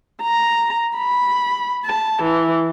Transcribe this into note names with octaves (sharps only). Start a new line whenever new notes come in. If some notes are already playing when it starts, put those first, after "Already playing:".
A#5
B5
A5
E3